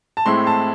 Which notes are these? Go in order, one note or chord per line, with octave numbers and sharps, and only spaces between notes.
A5
A2 G#3 C4 E4 C6
A5